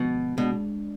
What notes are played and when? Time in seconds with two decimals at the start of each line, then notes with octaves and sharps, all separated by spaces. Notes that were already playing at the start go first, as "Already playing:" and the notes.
Already playing: B2 D3 F3 G#3
0.38 B2 G#3 D4